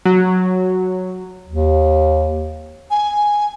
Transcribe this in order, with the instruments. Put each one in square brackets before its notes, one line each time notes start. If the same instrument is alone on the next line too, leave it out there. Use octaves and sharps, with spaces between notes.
[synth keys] F#3
[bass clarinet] D#2
[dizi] G#5